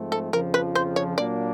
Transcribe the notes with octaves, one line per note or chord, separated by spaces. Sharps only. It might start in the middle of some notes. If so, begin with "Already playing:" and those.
Already playing: G#2 F3 A3 C4
A4
F2 C#3 F3 A#4
B4
C5
C#5
A#2 F#3 A#3 D4 D5